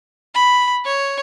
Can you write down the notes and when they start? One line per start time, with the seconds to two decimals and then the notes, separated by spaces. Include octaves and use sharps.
0.35 B5
0.85 C#5